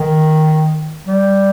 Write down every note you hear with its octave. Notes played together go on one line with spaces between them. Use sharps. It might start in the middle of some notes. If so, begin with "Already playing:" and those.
Already playing: D#3
G3